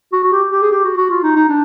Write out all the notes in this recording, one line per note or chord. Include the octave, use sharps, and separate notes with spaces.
F#4
F#4
G4
G4
G#4
G4
F#4
F#4
F4
D#4
D#4
D4